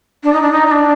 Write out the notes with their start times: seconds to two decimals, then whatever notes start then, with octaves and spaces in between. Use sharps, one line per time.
0.23 D4
0.33 D#4
0.42 D4
0.51 D#4
0.66 D#4
0.71 D4